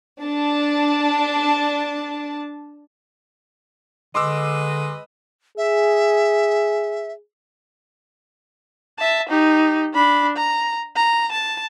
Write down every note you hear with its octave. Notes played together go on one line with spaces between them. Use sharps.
D4 A5
D3 G#3 B4 D#5 C6 D6 E6
G#4 E5
E5 A5
D#4 G4
D4 B5
A#5
A#5
A5